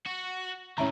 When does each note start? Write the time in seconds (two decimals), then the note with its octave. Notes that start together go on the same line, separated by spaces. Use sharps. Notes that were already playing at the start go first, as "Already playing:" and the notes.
0.06 F#4
0.78 A2 D#3 C#4 E4 A#5